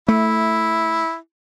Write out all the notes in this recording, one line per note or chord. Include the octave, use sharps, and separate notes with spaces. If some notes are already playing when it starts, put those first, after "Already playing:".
A3 E4